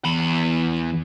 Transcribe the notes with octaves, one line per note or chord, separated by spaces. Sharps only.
E2 B5